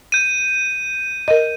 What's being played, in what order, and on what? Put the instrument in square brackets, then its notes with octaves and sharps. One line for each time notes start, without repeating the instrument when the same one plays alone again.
[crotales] G6 D#7
[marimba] A#4 D#5